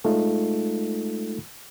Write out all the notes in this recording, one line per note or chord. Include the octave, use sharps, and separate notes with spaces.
G#3 A3 D#4 F4 A4